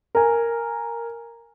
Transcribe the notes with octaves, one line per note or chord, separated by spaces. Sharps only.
A#4 G#5